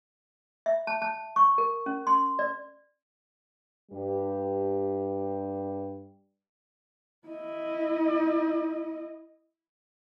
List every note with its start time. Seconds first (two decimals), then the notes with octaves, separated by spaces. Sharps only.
0.66 E5
0.87 A5
1.02 A5
1.36 C#6
1.58 A#4
1.86 C#4
2.07 C6
2.39 D5
3.91 G2 G3 G4
7.28 E4 D#5